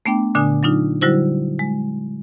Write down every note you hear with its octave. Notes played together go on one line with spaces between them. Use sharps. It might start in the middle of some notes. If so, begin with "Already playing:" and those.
A3 B3 D4 G5 D6
A#2 D3 D4 G#5 D#6
F#3 D4 D#4 F4
D3 F#3 G3 E4 F#4 C5
G#3